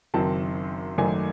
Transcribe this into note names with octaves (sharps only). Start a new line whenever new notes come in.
F#1 F#2 D#3 F#3 C4 A5
G#1 F#2 D#3 F#3 A3 G#5